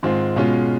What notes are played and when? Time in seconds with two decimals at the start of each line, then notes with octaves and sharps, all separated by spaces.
0.03 G#2 D#3 G#3 C4 F4
0.36 B2 G#3 C#4 F4